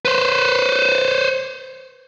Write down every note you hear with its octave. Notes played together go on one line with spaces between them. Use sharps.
B4 C5